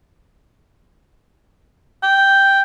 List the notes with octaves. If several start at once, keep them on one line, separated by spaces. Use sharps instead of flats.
G5